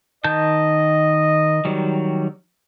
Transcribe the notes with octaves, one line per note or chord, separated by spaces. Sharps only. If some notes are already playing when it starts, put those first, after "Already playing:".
D#3 D#5 A5 G6
D#3 F#3 G3